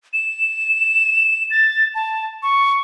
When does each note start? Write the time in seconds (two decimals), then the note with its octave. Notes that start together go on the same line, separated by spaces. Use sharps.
0.13 E7
1.51 A6
1.95 A5
2.43 C#6